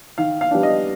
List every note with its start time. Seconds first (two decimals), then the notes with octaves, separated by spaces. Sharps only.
0.18 D#3 F5
0.41 F5
0.51 G3 B3 D4
0.63 D#5